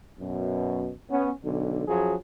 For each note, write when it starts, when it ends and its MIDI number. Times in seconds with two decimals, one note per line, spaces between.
0.20 0.90 42
0.20 0.90 47
1.11 1.31 59
1.11 1.31 61
1.44 1.85 35
1.44 1.85 50
1.87 2.15 42
1.87 2.15 53
1.87 2.15 54
1.87 2.15 68